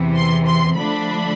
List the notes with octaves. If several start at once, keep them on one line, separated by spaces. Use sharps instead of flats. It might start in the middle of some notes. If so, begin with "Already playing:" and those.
Already playing: E2 C3 E3
C6
C6
D3 F3 A3 D4 B5